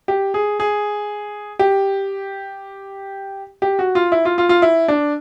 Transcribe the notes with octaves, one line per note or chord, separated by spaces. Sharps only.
G4
G#4
G#4
G4
G4
F#4
F4
E4
F4
F4
F4
E4
D4